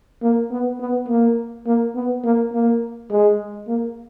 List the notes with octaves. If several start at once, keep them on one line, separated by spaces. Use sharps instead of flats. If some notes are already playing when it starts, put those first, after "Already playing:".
A#3
B3
B3
A#3
A#3
B3
A#3
A#3
G#3
A#3